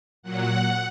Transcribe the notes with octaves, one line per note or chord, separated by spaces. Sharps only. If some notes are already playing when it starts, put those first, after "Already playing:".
A#2 F#3 F#5